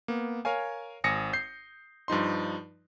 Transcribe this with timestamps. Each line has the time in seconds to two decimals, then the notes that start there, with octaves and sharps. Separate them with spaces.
0.08 A#3 B3
0.45 A#4 C#5 F5 G#5
1.04 G#1 G#5 D#6 A#6 C#7
1.33 G6 C7
2.08 G2 F3 D#4 C6